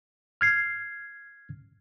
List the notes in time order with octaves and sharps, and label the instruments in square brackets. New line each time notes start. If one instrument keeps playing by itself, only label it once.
[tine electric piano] F6 G#6 C7